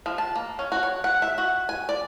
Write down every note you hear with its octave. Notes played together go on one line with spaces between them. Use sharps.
F3
A5
A#3
C#4
F#4
C#5
F#5
E5
F#4
G#5
D5